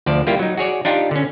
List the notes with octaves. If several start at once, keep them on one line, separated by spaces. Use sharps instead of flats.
D2 F3 D5 A5
G3 A#3 E4 F4 G4
F#3 D#4
F#4 G#4 C#5 D5
D4 D#4 F4 G4
D3 C#4